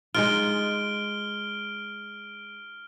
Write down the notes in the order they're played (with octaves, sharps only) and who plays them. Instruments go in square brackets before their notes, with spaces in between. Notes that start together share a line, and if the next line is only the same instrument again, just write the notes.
[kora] G#3 D#4 F4 [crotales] F6 D7 G7